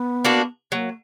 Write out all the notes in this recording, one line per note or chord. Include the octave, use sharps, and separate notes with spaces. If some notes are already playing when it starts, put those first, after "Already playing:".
Already playing: B3
A#3 D4 F#4
F#3 A#3